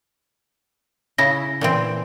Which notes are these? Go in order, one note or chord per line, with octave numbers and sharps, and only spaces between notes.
C#3 E4 A#6
A#2 E3 C4